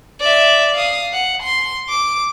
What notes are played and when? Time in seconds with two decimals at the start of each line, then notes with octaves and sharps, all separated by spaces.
0.20 D5 E5
0.75 F5 D#6
1.13 F#5
1.43 C6
1.89 D6